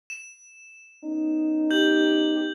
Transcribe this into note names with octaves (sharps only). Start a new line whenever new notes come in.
E7
B3 C#4 D#4
G4 G6 F#7